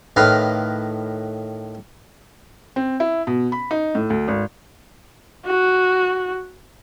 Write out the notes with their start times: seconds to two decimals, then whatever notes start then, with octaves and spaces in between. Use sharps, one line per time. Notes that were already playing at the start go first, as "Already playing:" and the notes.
0.16 A2 D#3 B4 F5 C6
2.76 C4
3.00 E4
3.27 B2
3.52 B5
3.71 D#4
3.95 A2
4.10 D2
4.28 G#1
5.46 F#4